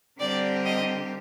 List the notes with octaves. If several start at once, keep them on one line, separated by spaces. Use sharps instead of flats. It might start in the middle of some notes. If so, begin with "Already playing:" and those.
D3 G3 C4 G4 A#4 D5
D#5